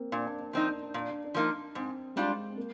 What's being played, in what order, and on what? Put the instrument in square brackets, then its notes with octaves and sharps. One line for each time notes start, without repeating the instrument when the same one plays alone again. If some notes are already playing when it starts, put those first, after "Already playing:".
Already playing: [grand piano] A#3 C4
[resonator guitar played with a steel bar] A#2 [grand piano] D4
[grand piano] D4
D4
[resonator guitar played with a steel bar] F3 C4 D#4 [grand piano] D4
[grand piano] D4
D4
[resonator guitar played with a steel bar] A#2 [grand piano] D4
[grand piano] D4
D4
[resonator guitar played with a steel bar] F3 A#3 D#4 [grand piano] D4
[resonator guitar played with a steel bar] G#2 [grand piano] C4
[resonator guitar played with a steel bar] G3 D4 F4 [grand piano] G#3
[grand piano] C4
A#3